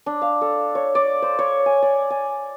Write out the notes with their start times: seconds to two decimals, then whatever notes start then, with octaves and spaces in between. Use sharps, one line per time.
0.06 D4
0.22 F5
0.41 A4
0.75 C#5
0.95 D5
1.22 C5
1.39 C#5
1.66 G#5
1.82 D5
2.10 G#5